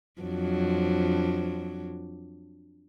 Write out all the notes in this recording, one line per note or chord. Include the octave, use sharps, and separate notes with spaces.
F2 F#3 D4